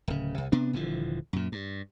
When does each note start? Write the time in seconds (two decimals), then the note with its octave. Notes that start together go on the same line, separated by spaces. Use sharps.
0.08 D1 C#3
0.38 C2
0.52 C3 B3 D4
0.73 D#1 D3 E3 F3
1.33 F#2 A#2
1.52 G2